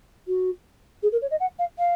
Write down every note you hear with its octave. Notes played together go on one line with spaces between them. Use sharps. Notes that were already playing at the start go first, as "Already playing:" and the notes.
F#4
G#4
A#4
C#5
D#5
F#5
F5
F5